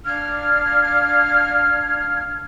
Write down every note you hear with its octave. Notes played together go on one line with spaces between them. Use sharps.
D4 F5 F6 G#6